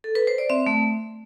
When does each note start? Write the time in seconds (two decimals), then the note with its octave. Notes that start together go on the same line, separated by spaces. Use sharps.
0.04 A4
0.15 B4
0.27 C5
0.38 D5
0.50 C4 E5
0.66 A3